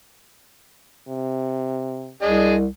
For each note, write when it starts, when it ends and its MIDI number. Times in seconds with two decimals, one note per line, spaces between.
1.08 2.13 48
2.22 2.67 36
2.22 2.54 62
2.22 2.54 68
2.22 2.54 75